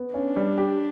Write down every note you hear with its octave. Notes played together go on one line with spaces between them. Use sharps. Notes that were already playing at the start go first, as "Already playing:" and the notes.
Already playing: B3
C#4 D4
G3
G4